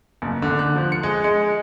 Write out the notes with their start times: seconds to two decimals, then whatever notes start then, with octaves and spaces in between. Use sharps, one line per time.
0.22 F#1
0.42 D3
0.59 F#6
0.76 F3
0.92 C#7
1.03 G#3
1.24 G#3